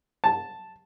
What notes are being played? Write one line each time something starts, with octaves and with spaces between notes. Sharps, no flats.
A5